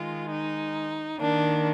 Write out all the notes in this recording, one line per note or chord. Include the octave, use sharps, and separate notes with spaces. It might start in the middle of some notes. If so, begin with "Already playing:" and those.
Already playing: D#3 G#3 F4
D#4
D#3 A#3 D4